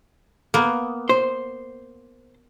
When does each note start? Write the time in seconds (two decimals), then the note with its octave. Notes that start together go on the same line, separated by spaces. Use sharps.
0.54 A#3 B3
1.09 C5